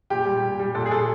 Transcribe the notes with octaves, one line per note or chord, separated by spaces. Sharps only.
A#2 G4
G3
A#2
G3
A#2 A4
G#4
G3 A4